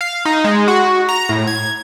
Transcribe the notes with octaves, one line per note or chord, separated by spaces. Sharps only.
F5
D#4
G#3
F#4
A#5
A2
G#6